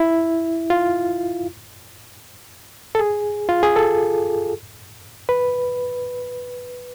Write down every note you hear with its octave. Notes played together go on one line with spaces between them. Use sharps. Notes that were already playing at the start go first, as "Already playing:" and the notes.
Already playing: E4
F4
A4
G#4
F4
G#4
A4
B4